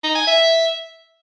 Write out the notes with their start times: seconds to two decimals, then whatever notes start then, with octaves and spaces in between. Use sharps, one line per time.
0.03 D#4
0.15 G#5
0.27 E5